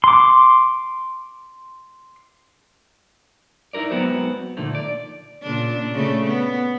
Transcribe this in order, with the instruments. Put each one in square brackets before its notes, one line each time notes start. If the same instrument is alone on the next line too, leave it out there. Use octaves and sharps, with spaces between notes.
[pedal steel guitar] C6 D6
[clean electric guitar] D#4 E4 F#4 A#4 D5
F#3 G#3 B3 C4 F#4 C5
A#2 D3 D#3 F3 A3
D5
[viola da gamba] A#2 C#3 D4
C#3 A3
B3